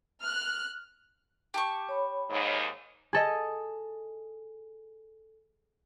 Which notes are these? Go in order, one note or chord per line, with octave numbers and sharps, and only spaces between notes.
F6 F#6
G4 A5 C#6
C#5 B5
D#2 G#2
G#4 A4 D#5